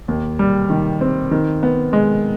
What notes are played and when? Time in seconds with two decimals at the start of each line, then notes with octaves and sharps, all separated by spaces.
0.08 D#2
0.39 G3
0.70 D#3
1.01 C4
1.31 D#3
1.63 B3
1.93 G#3